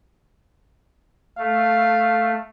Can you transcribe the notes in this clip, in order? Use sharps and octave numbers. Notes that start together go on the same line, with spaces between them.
A3 F5